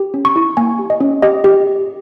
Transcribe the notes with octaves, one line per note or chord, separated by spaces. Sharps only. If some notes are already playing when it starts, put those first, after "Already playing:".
Already playing: G4
C#4
C#6
E4
A#3 G#5
G4
D#5
C#4
G4 D#5
G4